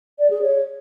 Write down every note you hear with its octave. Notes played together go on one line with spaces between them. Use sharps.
D5
G#4
C#5